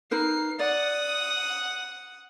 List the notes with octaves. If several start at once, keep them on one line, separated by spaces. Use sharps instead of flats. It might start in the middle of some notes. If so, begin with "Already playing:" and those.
D#4 A#4 B4 C7
D5 F#5 D#6